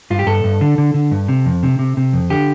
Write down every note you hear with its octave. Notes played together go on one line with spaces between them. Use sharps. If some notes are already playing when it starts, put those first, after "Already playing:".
G2 F4
G4
G2 A4
G2
D3
D3
D3
G2
C3
F2
C3
C3
C3
F2
D3 G4